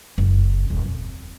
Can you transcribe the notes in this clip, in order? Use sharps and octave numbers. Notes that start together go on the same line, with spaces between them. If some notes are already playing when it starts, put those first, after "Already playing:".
F#1
D#1
F2